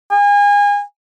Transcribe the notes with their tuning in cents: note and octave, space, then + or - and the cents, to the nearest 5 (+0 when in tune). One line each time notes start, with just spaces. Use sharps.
G#5 -30